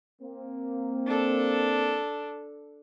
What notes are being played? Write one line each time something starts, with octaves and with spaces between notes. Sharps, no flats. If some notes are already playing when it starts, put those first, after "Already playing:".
A#3 C4
D4 A4